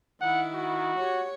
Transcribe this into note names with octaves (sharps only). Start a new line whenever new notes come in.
D#3 E4 F#5
F#4
G4 C#5